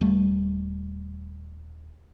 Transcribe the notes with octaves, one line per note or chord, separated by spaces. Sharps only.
D#1 G3 A3